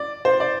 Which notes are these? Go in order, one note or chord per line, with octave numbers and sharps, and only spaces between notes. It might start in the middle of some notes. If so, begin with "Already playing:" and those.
Already playing: D5
C5
D5